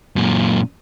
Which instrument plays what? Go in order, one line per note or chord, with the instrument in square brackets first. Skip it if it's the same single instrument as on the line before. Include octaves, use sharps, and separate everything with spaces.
[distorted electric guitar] F#2 A#2